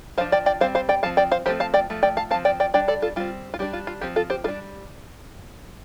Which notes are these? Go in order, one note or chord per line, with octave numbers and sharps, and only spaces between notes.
F3 D4 C5 F5
D5 G5
D5 G5
G3 C4 C5 F5
C5 F5
D5 G5
F3 C4 F5 A5
D5 G5
C5 F5
F3 A3 C4 G4 C5
F5 A5
D5 G5
F3 A3
D5 G5
F5 A5
F3 C4 F5 A5
D5 G5
D5 G5
G3 D4 D5 G5
A4 D5
F4 A4
G3 C4 F4
F4
G3 D4 G4
F4
F4
F3 C4 G4
F4 A4
G4 C5
G3 D4 F4 A4